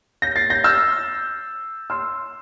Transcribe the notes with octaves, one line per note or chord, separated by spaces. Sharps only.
G6 A#6
A6 C7
G6 A#6
E6 G6
C6 E6